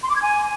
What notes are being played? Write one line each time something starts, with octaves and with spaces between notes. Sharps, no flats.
C6
D6
G#6
G#5